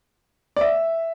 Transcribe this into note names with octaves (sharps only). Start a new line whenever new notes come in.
D5
E5